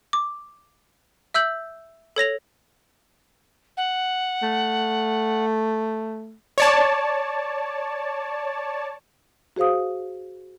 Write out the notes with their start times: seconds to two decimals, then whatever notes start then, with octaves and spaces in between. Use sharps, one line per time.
0.13 D6
1.34 E5 E6 G6 F#7
2.16 A4 C#5 A#6 F7
3.77 F#5
4.43 A3
6.58 C#5 D5 A5
9.56 F#4 G#4 C5 F5 D#6